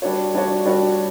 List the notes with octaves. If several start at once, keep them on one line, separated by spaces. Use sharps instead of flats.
G3 D4 F#4 C#5
G3 D4 F#4 C#5
G3 D4 F#4 C#5